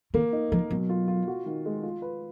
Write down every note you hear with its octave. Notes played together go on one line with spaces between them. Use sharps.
D#3 A#3
D#4
F3 A#4
B2 F#3
F4
F4
F#4
D#3
G#3
F4
B4